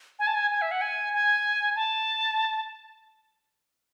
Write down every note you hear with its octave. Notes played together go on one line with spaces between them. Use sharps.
G#5
A5
G#5
G#5
E5
F#5
G#5
G#5
A5